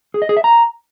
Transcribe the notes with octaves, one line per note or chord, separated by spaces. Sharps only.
G#4
D#5
G#4
E5
A#5